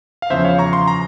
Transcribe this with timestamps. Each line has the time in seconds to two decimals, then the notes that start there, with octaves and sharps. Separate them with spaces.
0.22 F5
0.30 E2 C#3 F3 C5 E5
0.44 C#5 F5
0.59 A#5 C#6
0.73 C6
0.88 A#5